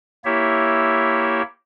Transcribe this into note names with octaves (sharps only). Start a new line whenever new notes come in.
A#3 E4 G4 C#5 E5